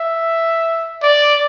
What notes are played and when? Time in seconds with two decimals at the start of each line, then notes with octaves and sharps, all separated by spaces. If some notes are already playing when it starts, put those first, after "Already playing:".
Already playing: E5
1.03 D5